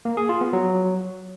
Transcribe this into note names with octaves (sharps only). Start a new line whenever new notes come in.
A#3
G#4
F4
B3
F#3